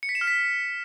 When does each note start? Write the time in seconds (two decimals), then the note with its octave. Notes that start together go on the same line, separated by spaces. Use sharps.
0.03 C#7
0.09 B6
0.15 E7
0.21 F6
0.27 B6